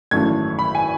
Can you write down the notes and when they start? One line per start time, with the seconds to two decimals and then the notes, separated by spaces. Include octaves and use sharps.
0.11 G#1 F#2 E3 A3 G#6
0.59 B5
0.75 G#5